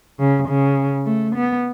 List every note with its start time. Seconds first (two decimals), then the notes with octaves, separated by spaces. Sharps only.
0.19 C#3
0.48 C#3
1.06 A3
1.35 B3